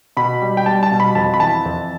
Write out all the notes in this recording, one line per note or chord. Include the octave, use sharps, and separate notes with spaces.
B2 B5
G3
G5
G3 A5
A5
B2
B5
F2 A5
B5
E3 A5
F2